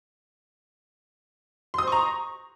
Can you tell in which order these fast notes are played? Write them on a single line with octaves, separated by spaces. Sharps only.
C6 D#6 C5 C#6 A#5